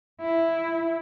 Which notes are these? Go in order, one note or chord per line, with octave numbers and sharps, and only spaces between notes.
E4